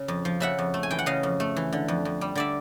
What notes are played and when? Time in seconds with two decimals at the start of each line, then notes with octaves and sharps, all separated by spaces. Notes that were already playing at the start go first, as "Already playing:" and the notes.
Already playing: C#3
0.08 F2
0.25 F3
0.40 C#3 E5 F#5
0.59 F2
0.74 A3
0.83 G#5
0.91 E3 G5
0.99 F#5
1.06 C#3 D#5 F5
1.23 F2
1.40 A3
1.56 E3
1.73 D3
1.88 F2
2.05 F2
2.21 G3
2.35 D3 D5 E5